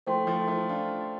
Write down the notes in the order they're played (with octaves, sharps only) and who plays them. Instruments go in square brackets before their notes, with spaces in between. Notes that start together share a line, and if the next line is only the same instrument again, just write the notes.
[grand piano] F3 A3 [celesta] C5 G5 C6
[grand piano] F3 A3
F3 A3
D4 F4